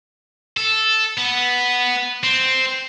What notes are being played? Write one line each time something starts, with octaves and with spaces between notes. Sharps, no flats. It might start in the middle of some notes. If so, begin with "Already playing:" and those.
A4
B3
C4